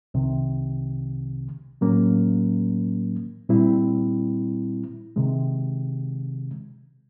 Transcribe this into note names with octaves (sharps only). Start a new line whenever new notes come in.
C2 C3 D#3
A2 F#3 A#3 C#4
A#2 G3 C4 E4
C3 D#3 G#3